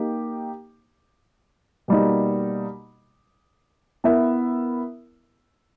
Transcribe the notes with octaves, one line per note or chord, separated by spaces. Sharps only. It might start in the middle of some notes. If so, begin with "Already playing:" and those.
Already playing: A#3 D#4 G4
B2 G3 A#3 D#4
B3 E4 A#4 E5